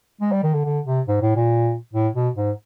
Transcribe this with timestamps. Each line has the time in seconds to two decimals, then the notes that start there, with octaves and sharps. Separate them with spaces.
0.21 G#3
0.32 G3
0.43 D#3
0.54 D3
0.65 D3
0.86 C3
1.08 G#2
1.22 A2
1.36 A#2
1.93 A2
2.14 B2
2.36 G#2